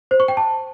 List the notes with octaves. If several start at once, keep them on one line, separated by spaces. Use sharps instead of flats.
C5
C#6
G5
A5